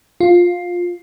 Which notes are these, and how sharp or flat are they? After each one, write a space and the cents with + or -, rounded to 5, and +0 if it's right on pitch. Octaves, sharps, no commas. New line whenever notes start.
F4 +10